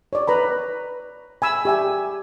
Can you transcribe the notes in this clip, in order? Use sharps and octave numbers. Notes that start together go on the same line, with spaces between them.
C#5 D5
B4 A#5 B5
G#5 B5 E6
G4 E5 G#5